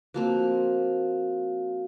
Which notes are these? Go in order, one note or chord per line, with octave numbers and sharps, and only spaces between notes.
F3 A#3 C4 F#4 F5